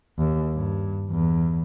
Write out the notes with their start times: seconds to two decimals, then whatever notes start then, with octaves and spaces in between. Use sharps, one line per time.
0.18 D#2
0.53 G2
1.12 E2